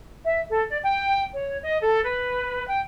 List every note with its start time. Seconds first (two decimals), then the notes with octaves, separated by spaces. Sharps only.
0.24 E5
0.49 A4
0.69 D5
0.82 G5
1.33 C#5
1.63 D#5
1.81 A4
2.03 B4
2.68 G5